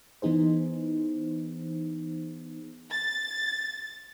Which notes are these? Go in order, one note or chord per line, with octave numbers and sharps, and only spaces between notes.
E3 B3 D#4 G#4 C5
A6